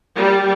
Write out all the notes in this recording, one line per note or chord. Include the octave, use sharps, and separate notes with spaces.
G3